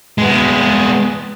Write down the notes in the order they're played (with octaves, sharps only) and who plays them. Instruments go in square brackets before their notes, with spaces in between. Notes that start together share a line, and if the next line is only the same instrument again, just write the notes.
[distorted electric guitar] G#3 B3